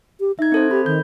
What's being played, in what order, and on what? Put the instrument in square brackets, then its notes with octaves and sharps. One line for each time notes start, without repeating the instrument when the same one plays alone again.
[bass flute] G4
[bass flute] D#4 [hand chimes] E5 G#6
[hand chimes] C4 A4 C5
[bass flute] G4 [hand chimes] B5
[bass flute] D#3 [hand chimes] G6